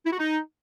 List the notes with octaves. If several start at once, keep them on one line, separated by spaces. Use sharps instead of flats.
E4
F#4
D#4